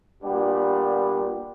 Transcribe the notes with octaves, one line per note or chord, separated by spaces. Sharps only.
A#2 G3 B3 D4 G4